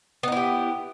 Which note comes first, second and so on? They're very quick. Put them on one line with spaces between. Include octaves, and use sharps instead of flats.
B3 D#4 E4 G4